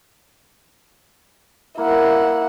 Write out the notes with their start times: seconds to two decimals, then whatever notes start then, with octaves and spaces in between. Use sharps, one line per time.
1.78 A#3 E4 F#5